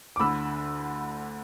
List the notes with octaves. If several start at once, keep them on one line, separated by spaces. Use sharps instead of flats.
D6
D2 D3 B5 E6